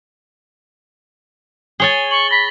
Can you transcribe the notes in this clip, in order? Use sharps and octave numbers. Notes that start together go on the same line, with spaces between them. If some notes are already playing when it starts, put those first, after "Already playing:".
G#4 C#5 G#5 A6 G7
C#6 F#7
B5 A#6 B6